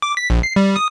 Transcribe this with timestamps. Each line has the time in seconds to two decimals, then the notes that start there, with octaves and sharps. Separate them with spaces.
0.02 D6
0.17 B6
0.30 A#1
0.43 C7
0.56 G3
0.76 D#6